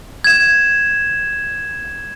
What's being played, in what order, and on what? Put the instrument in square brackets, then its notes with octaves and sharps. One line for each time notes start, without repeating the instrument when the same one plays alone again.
[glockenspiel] G#6 E7